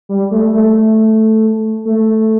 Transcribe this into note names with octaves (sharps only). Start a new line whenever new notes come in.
G3
A3
A3
A3